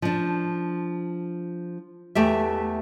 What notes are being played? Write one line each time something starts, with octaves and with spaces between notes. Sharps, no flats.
F3 D4
E2 A3 G4 E5